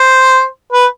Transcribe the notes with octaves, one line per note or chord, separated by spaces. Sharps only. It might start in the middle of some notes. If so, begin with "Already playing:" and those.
Already playing: C5
B4